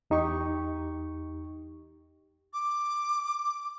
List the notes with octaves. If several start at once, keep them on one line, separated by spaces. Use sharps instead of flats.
E2 D#4 G4 C#6
D6